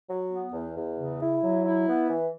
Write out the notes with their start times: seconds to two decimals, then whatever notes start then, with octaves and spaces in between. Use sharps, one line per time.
0.09 F#3
0.31 B3
0.53 E2
0.77 E2
0.98 C#3
1.20 E4
1.43 F#3
1.65 E4
1.88 B3
2.10 E3